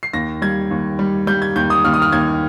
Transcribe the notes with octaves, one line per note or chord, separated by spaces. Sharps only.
C7
D#2 A#6
G3 G#6
D#2
G3
G3 G6
G#6
D#2 G6
D#6
D#2 F6
D#6
F6
D#2 G#6